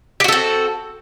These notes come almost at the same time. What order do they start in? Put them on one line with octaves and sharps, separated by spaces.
G4 F#4 A4 C4